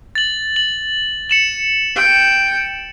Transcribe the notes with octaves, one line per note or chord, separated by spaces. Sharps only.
A6 F#7
F#7
C#7 E7 F#7
G5